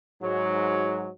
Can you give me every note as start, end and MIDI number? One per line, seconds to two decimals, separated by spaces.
0.22 1.09 44
0.22 1.09 54